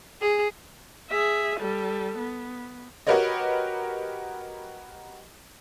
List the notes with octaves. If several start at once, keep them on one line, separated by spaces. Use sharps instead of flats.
G#4
G#4 E5
G3 A4
B3
F#4 G4 A#4 B4 C#5 D#5